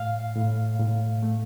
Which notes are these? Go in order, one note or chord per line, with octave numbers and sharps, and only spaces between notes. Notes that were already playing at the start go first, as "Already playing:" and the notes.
Already playing: A2 F5
A2
A2
A3